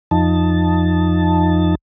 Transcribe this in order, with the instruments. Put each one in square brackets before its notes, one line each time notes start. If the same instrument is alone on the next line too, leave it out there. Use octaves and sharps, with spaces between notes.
[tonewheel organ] F2 F3 D#4 A5